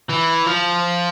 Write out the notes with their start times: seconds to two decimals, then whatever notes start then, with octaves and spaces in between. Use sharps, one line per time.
0.10 E3
0.47 F3